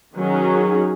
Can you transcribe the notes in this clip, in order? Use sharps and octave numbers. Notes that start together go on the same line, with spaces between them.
D#3 F#3 C#4 G#4